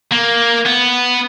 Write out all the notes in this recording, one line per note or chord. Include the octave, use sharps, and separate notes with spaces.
A#3
B3